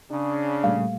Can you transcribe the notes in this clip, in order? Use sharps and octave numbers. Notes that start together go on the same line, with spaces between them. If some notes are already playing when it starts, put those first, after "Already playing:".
C#3 D4
A#2 G3 A3 F5